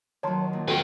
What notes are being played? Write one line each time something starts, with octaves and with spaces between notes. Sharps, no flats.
D#3 F#3 C#5 A5 C6
A#2
C4 F#4 A4 B4 F#5 G5 C#6